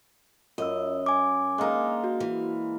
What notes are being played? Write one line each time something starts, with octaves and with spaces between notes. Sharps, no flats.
F#2 F4 D#5 E6
G#5 D6
G#3 A#3 D4 D#4 A#4
F#4
E3